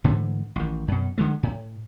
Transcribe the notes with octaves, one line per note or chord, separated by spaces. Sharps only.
G#2 D3 E3 A3
A1 D#3
F#2 B2
D3 F3 G#3 A3
A2